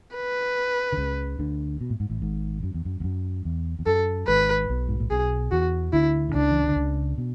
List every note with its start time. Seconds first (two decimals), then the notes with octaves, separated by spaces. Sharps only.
0.16 B4
0.92 D3
0.97 C#2 C#3
1.39 D2 D3
1.81 B2
1.90 A2
2.00 G#2
2.09 A1 A2
2.22 G#1 G#2
2.63 F#2
2.74 E2
2.85 F#2
3.00 E2
3.04 F#2
3.45 E2
3.79 E2
3.86 F#2 A4
4.27 G#1 G#2 B4
4.69 B1 B2
4.88 G#2
5.00 A2
5.10 B1 B2 G#4
5.52 E2 E3 F#4
5.93 D2 D3 E4
6.29 D3
6.34 C#2 C#3 D4
6.51 E3
6.64 D3
6.76 C#2 C#3
7.18 B2